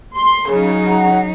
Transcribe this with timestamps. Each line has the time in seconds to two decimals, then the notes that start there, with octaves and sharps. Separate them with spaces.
0.16 C6
0.50 C#3 F#3 D#4
0.87 F#5 A#5